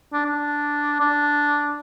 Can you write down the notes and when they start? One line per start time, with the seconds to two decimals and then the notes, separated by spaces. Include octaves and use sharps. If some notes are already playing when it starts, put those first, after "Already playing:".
0.13 D4
0.25 D4
1.00 D4